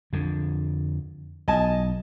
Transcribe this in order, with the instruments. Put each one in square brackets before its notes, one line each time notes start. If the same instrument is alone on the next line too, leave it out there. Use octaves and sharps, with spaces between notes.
[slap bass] F2 D3
[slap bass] B1 [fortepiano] D#5 G#5 A5